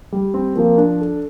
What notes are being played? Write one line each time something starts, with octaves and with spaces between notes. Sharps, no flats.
G3
C4
F3 A#3
D4
A4